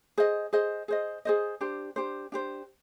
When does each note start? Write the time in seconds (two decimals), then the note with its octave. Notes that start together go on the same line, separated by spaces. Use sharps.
0.18 G#4 C5 D#5
0.53 G#4 C5 D#5
0.88 G#4 C5 D#5
1.25 G#4 C5 D#5
1.61 D4 G4 C5
1.96 D4 G4 C5
2.32 D4 G4 C5